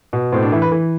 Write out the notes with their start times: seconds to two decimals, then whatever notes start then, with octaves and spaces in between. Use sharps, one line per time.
0.13 B2
0.32 A2 C4
0.42 D4
0.52 E3 E4
0.62 B4
0.72 E3